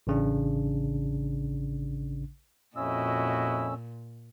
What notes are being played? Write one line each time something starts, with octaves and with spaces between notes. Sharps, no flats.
A1 C#3 D4
F2 A#2 C#4 E4 F#4 D#5 E6